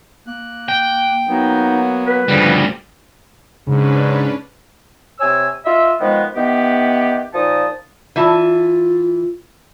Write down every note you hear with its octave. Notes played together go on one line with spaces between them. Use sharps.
A#3 F#6
G5
F#3 A#3 B3 D#4
B4
D2 C#3 F3 G3 G#4
G#2 C#3 C#4 D4 B4
C3 C#5 G#5 E6
F4 D#5 E5
D#3 F3 G#3 B3
D#3 E3 B3 G4
A#2 F3 D#4 A5 D#6
E3 F4 E5 A5